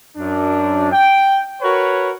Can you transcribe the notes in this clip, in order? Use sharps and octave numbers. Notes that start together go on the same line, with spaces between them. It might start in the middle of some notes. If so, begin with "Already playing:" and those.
F#2 D4
G5
F#4 A#4 B4 C#5